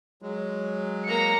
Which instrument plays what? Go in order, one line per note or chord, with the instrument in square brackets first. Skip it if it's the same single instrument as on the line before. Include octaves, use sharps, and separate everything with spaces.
[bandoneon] F#3 G#3
[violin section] A#3 A#5 C#7